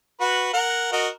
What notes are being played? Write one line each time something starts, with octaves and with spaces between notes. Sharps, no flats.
F#4 B4
A#4 F#5
F#4 A#4 D#5